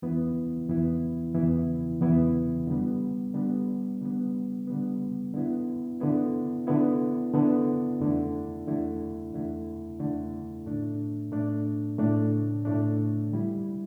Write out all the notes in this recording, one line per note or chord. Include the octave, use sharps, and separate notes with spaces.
E2 E3 B3 E4
E2 E3 B3 E4
E2 E3 B3 E4
E2 E3 B3 E4
D3 G3 B3
D3 G3 B3
D3 G3 B3
D3 G3 B3
D3 B3 E4
D3 B3 E4
D3 B3 E4
D3 B3 E4
E2 D3 A3 E4
E2 D3 A3 E4
E2 D3 A3 E4
E2 D3 A3 E4
A2 A3 D4
A2 A3 D4
A2 A3 D4
A2 A3 D4
D3 G3 E4